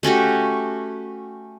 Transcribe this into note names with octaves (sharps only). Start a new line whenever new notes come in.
A3 C#4 F#4 G4